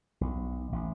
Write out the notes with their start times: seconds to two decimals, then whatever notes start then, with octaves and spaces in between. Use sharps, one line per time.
0.21 B1
0.72 A1